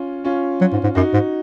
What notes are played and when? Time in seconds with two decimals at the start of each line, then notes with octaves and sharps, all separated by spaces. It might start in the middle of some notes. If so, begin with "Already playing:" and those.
Already playing: C#4 F4
0.24 C#4 F4
0.61 F#3
0.73 G#2
0.83 G#2
0.95 F#2 D#4 F#4
1.13 G#2